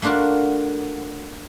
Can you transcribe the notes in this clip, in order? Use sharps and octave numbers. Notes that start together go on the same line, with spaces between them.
A3 A#3 D4 F4 F#4